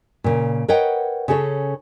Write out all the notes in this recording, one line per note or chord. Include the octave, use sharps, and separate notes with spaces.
A#2 C#3
A#4 B4 C#5 D#5 F#5 G5
C#3 C#4 G#4 A4 C#5